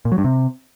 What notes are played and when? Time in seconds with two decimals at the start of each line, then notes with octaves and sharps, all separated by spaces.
0.05 A#2
0.12 F#3
0.18 G2
0.24 C3